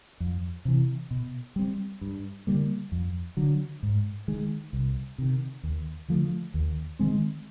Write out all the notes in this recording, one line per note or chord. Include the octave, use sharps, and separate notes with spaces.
F2
C3 E3
B2
G3 C4
G2
D3 G3 A#3
F2
D3 F#3
G#2
D#3 G#3
C2
C3 D#3
D#2
D3 F3 A3
D#2
D#3 G#3 C4